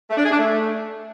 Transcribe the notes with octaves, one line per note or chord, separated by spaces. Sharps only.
A3
D4
G#4
D4
A3